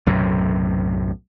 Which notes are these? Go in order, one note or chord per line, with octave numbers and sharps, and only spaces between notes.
B1 F#2 A2 C3